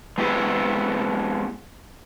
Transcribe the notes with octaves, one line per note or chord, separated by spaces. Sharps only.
G#3 B3 C4 E4 G4 G#4